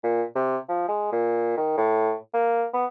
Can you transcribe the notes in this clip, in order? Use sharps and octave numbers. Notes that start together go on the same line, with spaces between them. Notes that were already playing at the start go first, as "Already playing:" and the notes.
A#2
C3
F3
G#3
A#2
D#3
A2
A#3
B3